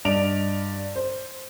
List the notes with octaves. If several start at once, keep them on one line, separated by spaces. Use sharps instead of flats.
G2 D5 D#5 D7 F7
C5